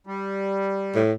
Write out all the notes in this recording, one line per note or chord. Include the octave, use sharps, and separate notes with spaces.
G3
A2